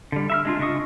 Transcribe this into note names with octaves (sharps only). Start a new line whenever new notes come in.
D3 G3
E5 B5 F6
G#3 D4 F4
C#3 D4 D#5 C#6 D#6